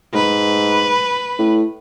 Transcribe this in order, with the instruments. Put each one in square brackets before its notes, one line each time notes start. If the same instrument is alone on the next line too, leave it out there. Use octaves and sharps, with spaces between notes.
[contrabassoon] G#2 [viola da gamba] B4
[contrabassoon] A2